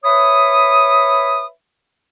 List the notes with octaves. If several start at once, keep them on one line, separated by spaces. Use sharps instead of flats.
B4 C#5 E5 B5 D#6